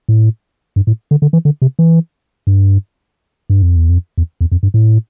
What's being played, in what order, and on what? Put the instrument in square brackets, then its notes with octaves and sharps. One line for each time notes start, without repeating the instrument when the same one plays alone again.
[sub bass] A2
G2
A2
D3
D3
E3
D3
C3
E3
G2
G2
F2
E2
F2
E2
E2
F2
G2
A2